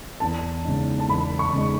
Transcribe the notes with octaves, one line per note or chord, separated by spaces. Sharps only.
E2 A5
C#3 G#3 D#4
A5
E2 B5
C#6
C#3 G#3 D#4